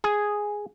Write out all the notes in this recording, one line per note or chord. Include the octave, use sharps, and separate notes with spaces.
G#4